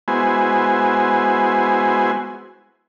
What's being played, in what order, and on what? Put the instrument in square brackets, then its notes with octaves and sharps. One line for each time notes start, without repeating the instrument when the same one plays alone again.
[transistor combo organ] G#3 B3 E4 F#4 C5 G#5